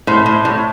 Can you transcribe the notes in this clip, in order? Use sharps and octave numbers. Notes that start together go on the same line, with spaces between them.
A2 C5
A2
A2